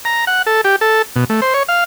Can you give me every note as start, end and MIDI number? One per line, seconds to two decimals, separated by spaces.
0.05 0.25 82
0.27 0.42 78
0.46 0.61 69
0.64 0.76 67
0.81 1.02 69
1.16 1.24 47
1.30 1.41 57
1.42 1.54 72
1.54 1.63 73
1.69 1.84 77